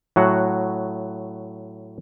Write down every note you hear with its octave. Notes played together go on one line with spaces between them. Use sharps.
A2 F#3 F#4 F#5